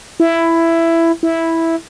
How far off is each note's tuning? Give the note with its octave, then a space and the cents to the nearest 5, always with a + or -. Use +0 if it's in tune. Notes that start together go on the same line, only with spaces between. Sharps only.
E4 +10
E4 -5